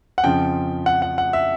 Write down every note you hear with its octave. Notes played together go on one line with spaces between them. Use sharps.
F#5
F2 C#3 F3 G5
F#5
F#5
F#5
E5